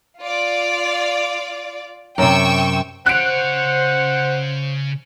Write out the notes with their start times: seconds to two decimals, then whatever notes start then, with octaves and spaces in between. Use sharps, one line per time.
0.20 F4 D5
2.18 F#2 C3 G5 C#6 E6
3.06 C#3 C5 C#5 F#5 F#6 D7